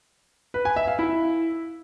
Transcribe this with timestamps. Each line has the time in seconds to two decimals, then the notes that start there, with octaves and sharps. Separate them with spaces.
0.54 B4
0.65 G#5
0.76 E5
0.88 F5
0.99 E4